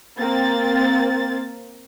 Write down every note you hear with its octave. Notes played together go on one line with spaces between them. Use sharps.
A#3 C4 A6